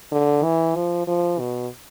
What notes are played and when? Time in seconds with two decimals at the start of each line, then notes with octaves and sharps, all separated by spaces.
0.12 D3
0.43 E3
0.76 F3
1.07 F3
1.39 B2